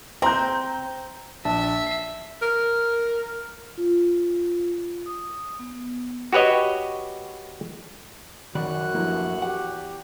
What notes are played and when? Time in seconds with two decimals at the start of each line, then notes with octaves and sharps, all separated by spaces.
0.22 C4 A#5 G6
1.45 A#1 D4 E5 A5
1.87 C7
2.42 A#4
3.78 F4
5.06 D#6
5.59 B3
6.32 F#4 G4 B4 C#5 D#5
8.55 F#2 D#3 F#4 D5 B5 F#6
8.94 G2 F3 A3 A#3 E4
9.42 E2 G4 F#5